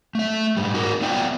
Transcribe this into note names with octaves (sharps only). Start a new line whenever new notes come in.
A3 E5
G#2 G3
D#4 F#4 A#4
A#3 B3 F4 D5 E5 G5